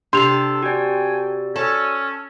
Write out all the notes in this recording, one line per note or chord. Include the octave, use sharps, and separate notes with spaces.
C3 D4 A4 C6 C7 F7
F#4 D5 G5 G#5
C#4 A4